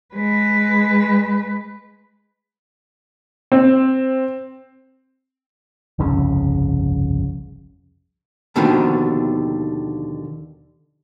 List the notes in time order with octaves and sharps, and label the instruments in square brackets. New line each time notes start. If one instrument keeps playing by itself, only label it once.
[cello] G#3 B4
[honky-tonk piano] C4
[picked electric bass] G1 C2 F2 C#3
[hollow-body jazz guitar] D#2 B2 D3 D#3 F3 B3